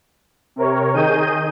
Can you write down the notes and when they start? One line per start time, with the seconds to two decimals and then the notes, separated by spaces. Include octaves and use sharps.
0.56 C3 A#4 C#5
0.94 D#3 G#4 D#5 G6 D#7